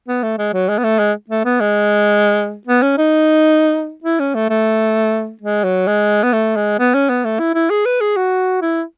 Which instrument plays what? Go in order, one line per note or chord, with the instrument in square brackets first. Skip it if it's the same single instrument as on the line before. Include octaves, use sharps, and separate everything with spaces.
[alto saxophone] B3
A3
G#3
F#3
G#3
B3
A3
G#3
A3
B3
G#3
B3
C#4
D#4
E4
C#4
A3
A3
G#3
F#3
G#3
B3
A3
G#3
B3
C#4
B3
A3
E4
E4
G#4
B4
G#4
F#4
E4